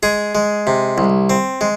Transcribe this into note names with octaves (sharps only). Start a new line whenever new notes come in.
G#3 G#4
G#3
C3
C2
C4
G#3